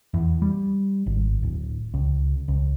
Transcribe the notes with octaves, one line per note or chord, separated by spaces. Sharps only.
E2
G3
G#1
D1
C#2
C#2